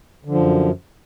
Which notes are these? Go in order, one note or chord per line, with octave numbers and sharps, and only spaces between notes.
F#2 D3 F3